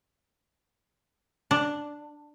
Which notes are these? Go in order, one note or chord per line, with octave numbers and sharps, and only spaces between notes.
D4